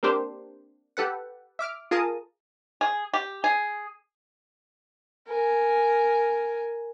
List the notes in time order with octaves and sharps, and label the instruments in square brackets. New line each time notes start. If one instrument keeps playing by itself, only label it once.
[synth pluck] A#3 C4 D4 G4 C5
G4 A4 B4 F#5
E5 D6 F6
F4 G#4 A#4 A5 D#6
[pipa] G#4
G4
G#4
[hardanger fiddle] A#4 G#5